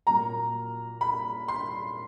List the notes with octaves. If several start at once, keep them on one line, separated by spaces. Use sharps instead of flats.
A#2 F#3 A#3 A#5
B5
C6